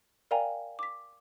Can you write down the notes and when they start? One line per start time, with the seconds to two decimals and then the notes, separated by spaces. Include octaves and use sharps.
0.31 A#4 D5 F5 G5 G#5 A#5
0.79 D6 B6